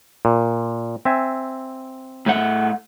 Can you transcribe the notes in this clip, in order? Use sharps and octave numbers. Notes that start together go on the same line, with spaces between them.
A#2
C4 E5 G#5
A2 A3 F#5